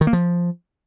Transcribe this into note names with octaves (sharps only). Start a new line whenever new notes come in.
D#3
A#3
F3